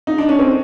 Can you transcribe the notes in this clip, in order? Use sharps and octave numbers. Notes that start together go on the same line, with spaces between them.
D#4
D4
C#4
C4